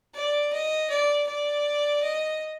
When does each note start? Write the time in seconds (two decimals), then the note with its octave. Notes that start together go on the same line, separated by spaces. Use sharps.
0.15 D5
0.53 D#5
0.90 D5
1.27 D5
2.02 D#5